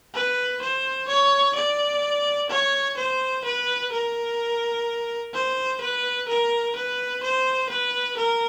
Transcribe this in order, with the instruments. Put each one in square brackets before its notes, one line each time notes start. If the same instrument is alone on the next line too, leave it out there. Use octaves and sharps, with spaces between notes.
[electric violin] B4
C5
C#5
D5
C#5
C5
B4
A#4
C5
B4
A#4
B4
C5
B4
A#4